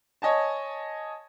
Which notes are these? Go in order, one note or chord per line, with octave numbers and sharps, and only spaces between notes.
C#5 D#5 G#5 A5